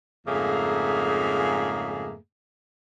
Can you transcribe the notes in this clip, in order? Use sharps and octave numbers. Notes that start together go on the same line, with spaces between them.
F2 G#2 C#3 A3 A#3 G#4